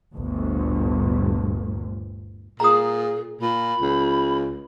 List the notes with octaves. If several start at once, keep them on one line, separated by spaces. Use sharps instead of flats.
G1 D2 A#2
A#2 G#4 A#5 D#6
A#2 B5
C#2